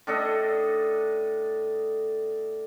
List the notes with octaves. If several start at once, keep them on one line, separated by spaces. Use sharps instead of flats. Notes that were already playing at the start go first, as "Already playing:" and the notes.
A2 D4 A4 D#5